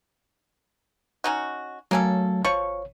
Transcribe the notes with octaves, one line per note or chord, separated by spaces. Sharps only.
C#4 D#4 F#4
F#3 A3 A#3 C#4 A4
G#1 F3 C#5 C#6